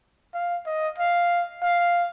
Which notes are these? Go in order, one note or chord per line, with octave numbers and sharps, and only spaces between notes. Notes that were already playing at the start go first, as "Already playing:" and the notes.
F5
D#5
F5
F5